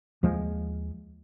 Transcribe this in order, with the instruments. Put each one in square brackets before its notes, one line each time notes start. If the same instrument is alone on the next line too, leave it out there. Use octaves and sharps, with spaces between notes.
[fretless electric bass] D#2 F3 G#3